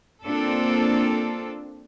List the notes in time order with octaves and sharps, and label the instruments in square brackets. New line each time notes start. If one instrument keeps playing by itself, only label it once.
[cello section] A#3 C4 D4 F4 A4